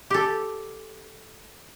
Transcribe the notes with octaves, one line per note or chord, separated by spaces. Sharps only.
G4 A4